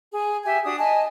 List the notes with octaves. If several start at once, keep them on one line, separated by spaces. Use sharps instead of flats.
G#4
G4 E5 G#5 G#6
D4 F#4 D#6
D#5 G#5 A5